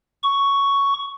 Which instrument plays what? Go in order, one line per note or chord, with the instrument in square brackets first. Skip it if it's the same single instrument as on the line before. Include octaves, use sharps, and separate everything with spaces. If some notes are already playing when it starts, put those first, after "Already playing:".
[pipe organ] C#6